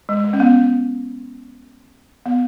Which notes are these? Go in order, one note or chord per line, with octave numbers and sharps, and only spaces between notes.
G#3
G#3
C#4
B3
B3